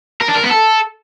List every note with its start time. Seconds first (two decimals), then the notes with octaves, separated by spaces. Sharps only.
0.21 A#4
0.28 D4
0.35 A#4
0.43 B3
0.50 A4